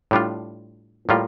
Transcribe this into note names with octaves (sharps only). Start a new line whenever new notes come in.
A2 G3 D4 F4
A2 G3 A#3 F4